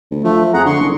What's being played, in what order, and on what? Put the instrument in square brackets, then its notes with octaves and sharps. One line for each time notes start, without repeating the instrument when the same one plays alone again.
[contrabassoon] D2
[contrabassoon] F3 [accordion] A3
[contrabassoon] F2 [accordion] G#4 F#5 A#5
[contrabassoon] D3 [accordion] C6 C#6
[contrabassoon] F#1